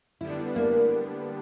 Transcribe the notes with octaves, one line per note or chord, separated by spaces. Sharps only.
D3 G3 B3 D4 E4
A#3